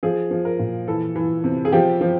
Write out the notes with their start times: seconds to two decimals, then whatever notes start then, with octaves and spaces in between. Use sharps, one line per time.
0.03 F3 G#4
0.31 F3
0.45 A#4
0.59 A#2
0.88 E3 A4
1.16 E3
1.44 C3
1.65 G#4
1.72 F3 G4
2.01 F3